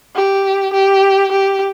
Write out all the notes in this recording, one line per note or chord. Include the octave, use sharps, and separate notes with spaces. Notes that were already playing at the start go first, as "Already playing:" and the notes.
G4
G4
G4